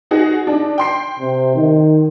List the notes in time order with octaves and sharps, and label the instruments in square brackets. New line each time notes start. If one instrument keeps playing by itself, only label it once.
[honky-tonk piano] D#4 F#4 G#4
D4 D#4
G5 C6 C7
[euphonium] C3
D#3